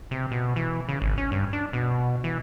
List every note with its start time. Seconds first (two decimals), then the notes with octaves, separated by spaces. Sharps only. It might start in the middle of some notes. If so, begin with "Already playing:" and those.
0.11 C3
0.32 B2
0.56 E3
0.89 C#3
1.02 G#1
1.18 C#4
1.32 G2
1.53 D4
1.73 B2
2.24 E3